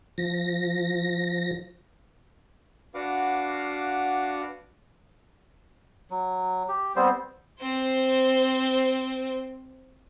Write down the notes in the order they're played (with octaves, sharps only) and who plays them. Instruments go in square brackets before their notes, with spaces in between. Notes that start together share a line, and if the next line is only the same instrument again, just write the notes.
[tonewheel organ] F3 A#6
[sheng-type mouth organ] D4 F#4 B4 F5 F#5 D6
[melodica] F#3
G4
G3 B3 C4 C5
[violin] C4 C5